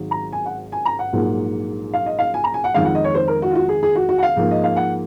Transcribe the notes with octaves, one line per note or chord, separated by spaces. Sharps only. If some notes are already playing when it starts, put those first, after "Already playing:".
Already playing: G#1 G#2 F#3
A#5
G#5
F#5
G#5
A#5
F#5
A#1 G#2 F#3 A#3
F5
D#5
F5
G#5
A#5
G#5
F#5
F2 D#3 G#3 F5
F#5
D#5
C#5
C5
A#4
F#4
F4
F#4
G#4
G#4
F#4
F#4
F#5
F5
G#2 F3 A#3
D#5
F5
F#5